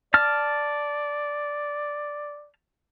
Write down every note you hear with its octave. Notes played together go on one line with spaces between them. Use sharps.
D5 A5 F6